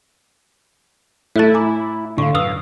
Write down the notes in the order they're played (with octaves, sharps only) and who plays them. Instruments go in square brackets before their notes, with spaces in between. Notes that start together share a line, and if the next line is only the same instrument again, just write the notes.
[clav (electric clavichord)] A2 A3 [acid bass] E4 [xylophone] E5 F#6 A6
[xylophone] G#5 A#5 D6
[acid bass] A2 [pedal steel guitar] D3 [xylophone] F5 C#6
[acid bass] F#2 [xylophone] B4 D#6 E6 [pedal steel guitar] F5